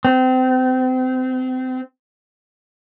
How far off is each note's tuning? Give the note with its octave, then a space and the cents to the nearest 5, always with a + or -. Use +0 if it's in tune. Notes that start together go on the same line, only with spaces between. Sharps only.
C4 -30